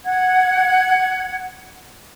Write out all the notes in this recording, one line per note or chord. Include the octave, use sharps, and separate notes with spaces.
F#5 G#6